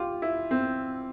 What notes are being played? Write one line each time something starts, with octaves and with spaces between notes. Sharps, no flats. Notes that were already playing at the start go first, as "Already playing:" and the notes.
Already playing: F4 G4
E4
C4